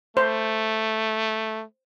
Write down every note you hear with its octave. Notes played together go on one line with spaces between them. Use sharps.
A3 C5